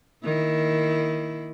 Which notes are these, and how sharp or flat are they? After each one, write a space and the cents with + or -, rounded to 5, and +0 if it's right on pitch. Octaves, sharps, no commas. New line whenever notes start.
D#3 +0 A#3 +0 E4 +0